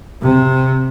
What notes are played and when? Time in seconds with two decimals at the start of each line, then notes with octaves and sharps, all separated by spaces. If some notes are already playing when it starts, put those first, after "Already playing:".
0.22 C3